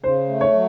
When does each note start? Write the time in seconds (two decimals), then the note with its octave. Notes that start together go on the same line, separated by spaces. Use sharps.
0.03 C#3 C5
0.28 A3
0.41 C#5
0.53 F#3